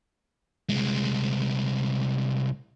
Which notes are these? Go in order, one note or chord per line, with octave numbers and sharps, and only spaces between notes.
C2 G#3